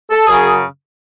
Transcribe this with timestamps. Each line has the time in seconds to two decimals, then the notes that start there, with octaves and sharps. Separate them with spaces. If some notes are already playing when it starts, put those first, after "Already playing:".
0.10 A4
0.26 F#2 C#3 F#3 G#4